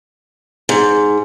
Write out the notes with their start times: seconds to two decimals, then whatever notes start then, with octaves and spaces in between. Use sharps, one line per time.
0.69 G#2